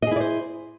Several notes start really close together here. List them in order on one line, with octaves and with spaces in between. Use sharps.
D#5 G#4 E4 D5 C5